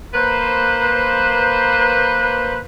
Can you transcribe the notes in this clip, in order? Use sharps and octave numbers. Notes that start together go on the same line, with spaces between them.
A#3 B4 C5